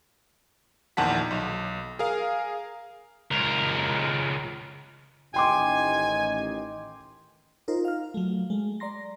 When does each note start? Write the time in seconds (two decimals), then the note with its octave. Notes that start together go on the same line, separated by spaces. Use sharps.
0.97 A#1 E2 D#3 F#5 A5 B6
1.31 B1
1.99 G#4 A#4 F5
3.31 C#2 A#4
5.34 A1 D#3 D#5 G5 G#5 C6 D6
7.68 D#4 F4 A#4 C5
7.85 F5 F6
8.14 F#3 A3
8.50 G#3 A3
8.80 D5 A#5 C6 A#6